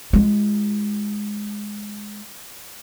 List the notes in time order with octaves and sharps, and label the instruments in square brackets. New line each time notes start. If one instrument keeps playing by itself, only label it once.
[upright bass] G#3 F4